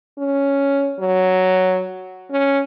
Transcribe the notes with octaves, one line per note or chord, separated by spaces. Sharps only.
C#4
F#3
C#4